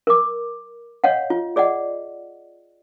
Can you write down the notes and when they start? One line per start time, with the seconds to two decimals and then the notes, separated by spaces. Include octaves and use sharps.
0.07 A#4 D6
1.04 C#5 D#5 F5 F#5
1.30 F4
1.56 G#4 D5 D#5 F#5